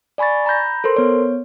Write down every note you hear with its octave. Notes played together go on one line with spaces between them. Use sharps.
D5 G#5 B5 C#6 A6
A#5 B5 G6 A#6
A4 A#4 C5 C6
B3 C#5